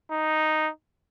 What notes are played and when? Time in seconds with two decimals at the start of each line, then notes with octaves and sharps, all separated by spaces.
0.12 D#4